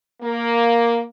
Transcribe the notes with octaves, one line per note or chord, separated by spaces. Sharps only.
A#3